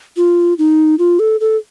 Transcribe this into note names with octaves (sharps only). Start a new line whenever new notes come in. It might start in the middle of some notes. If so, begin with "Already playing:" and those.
F4
D#4
F4
A4
A4